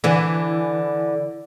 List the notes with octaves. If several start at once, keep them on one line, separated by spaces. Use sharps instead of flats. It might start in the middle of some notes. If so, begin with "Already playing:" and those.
D3 E3